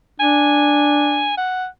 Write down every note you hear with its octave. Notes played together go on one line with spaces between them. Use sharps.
D4 G#5
F#5